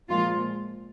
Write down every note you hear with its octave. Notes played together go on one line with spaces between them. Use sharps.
A#2 F3 G#3 F4